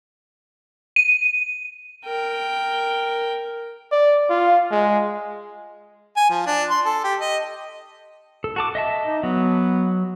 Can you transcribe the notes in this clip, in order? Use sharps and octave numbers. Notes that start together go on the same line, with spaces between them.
D#7
A#4 G5
D5
F4
G#3
G#5
F3
D4
C6
A4
G4
D#5
A4
F#4 A5 D6
D#5 E5 A5
D#4
F#3 B3